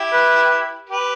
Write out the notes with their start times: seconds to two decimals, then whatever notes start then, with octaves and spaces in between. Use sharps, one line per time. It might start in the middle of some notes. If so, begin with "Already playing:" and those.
Already playing: E4 G4
0.13 B4
0.89 G4 B4